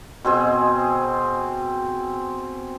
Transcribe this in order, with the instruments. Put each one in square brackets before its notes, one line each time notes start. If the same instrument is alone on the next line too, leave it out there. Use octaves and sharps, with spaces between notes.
[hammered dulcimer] B2 C4 G#4